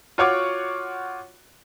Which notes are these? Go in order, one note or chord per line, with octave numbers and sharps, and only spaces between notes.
F4 F#4 C#5 F#5 C#6 D6